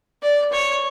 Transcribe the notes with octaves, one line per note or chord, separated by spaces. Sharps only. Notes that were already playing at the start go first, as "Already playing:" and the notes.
D5
C#5